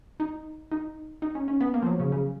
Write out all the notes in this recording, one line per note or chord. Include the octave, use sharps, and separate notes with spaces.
D#4
D#4
D#4
C#4
C#4
B3
A#3
F3
F#3
C#3
C#3